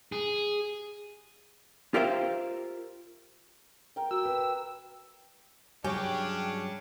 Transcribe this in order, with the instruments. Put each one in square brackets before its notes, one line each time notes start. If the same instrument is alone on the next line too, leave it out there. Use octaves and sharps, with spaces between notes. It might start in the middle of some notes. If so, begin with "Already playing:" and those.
[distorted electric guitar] G#4
[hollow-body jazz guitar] F4 G4 A#4 C5 E5 F5
[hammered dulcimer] A#4 G5
[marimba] F#4 [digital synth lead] E6
[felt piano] B4
[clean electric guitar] G2 F#3 C#5 [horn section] C#3 C#4 D4 [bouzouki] G4 [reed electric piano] G#5